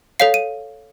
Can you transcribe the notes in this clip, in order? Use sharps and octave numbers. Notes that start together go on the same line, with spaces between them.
A4 C#5 F5 C7
D#7